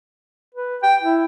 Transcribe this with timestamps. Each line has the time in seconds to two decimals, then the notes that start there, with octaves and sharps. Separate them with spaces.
0.55 B4
0.83 G5
1.02 E4